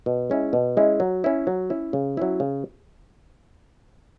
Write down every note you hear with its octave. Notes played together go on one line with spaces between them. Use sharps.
B2
G#3 C#4 E4
B2
G#3 C#4 E4
F#3
C#4 E4
F#3
C#4 E4
C#3
F#3 C#4 E4
C#3